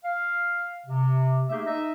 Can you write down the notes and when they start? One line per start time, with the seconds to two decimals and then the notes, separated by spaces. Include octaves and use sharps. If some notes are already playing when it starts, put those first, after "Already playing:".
0.04 F5
0.87 C3
1.50 A3 A#3 D#4 G4 G#4 E5
1.65 D#4 D#5 E5